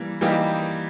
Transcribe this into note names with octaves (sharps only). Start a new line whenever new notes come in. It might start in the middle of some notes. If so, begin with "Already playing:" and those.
Already playing: E3 G3 A#3
E3 G3 A#3 D#4 G4